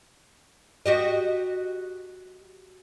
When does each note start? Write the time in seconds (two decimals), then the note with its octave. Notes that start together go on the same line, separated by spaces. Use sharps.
0.86 F#4 G4 D#5